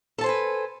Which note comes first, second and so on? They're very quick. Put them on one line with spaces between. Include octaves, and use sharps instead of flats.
A4 A5 C5 G#5 B4